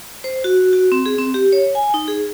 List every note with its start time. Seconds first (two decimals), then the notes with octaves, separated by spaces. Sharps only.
0.24 C5
0.44 F#4
0.73 F#4
0.92 C4
1.06 G#4
1.18 C4
1.34 G4
1.52 C#5
1.75 G#5
1.94 D#4
2.08 G#4